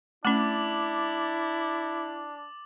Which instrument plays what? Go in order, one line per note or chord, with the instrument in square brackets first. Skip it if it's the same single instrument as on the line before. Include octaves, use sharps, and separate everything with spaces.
[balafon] A3 C#4 [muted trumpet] D4 [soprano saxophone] E4 [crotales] D6 A6 F#7